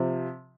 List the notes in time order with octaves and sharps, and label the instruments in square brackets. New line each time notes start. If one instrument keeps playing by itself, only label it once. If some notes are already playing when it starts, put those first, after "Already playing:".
Already playing: [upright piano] C3 F3